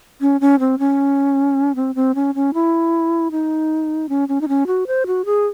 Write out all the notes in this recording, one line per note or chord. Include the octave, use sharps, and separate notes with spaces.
C#4
C#4
C4
C#4
C4
C4
C#4
C#4
E4
D#4
C#4
C#4
D#4
C#4
F#4
C5
F#4
G#4